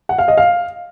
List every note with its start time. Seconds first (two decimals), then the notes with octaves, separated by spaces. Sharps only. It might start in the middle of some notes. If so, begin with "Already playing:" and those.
0.09 F#5
0.18 F5
0.28 D#5
0.37 F5